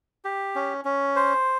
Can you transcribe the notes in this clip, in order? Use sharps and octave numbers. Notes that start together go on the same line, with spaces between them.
G4
C#4
C#4
C5